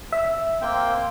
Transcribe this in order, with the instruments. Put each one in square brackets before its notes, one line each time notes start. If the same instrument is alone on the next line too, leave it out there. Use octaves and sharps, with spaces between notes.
[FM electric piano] E5
[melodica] A#3 C4 G5